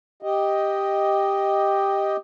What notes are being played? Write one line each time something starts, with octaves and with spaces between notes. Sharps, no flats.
G4 D#5